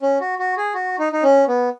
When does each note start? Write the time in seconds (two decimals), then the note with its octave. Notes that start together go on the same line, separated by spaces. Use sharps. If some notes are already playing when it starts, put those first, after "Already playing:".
0.02 C#4
0.20 F#4
0.39 F#4
0.57 G#4
0.74 F#4
0.99 D#4
1.13 D#4
1.23 C#4
1.48 B3